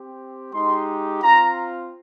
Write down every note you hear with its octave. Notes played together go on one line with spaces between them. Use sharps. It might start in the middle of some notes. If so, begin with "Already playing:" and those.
Already playing: C4 G4
G#3 D#4 G4 C6
C4 F4 A#5